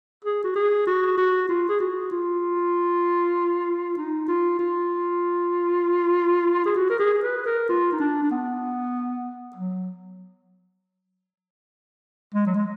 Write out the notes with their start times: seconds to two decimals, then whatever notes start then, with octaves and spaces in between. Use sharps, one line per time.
0.24 G#4
0.44 F#4
0.55 G#4
0.87 F#4
1.17 F#4
1.49 F4
1.69 G#4
1.80 F#4
2.11 F4
3.97 D#4
4.28 F4
4.59 F4
6.65 G#4
6.76 F#4
6.90 A#4
6.99 G#4
7.23 B4
7.46 A#4
7.69 F4
7.92 D#4
8.00 D4
8.23 D4
8.31 B3
9.56 F#3
12.34 G#3
12.46 F#3
12.56 G#3